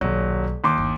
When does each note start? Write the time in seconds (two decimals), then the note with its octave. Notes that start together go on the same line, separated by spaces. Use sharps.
0.01 D#1 B1 F#3
0.64 D#2 C6 D6
0.78 G1